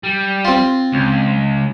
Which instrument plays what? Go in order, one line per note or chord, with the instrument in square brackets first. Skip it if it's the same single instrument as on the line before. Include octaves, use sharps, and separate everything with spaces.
[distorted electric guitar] G3
[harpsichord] C4 F4
[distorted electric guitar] C#2